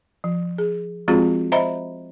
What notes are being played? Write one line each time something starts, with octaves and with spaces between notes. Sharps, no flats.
F3
G#4
F3 G#3 C4 F4 F#4 G#4
C5 D#5 E5 A#5 B5